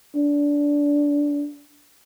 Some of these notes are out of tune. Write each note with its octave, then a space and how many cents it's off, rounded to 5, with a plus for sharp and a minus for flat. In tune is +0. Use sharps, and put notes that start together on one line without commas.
D4 -20